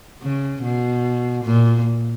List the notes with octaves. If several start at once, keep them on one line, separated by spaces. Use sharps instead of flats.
C#3
B2
A#2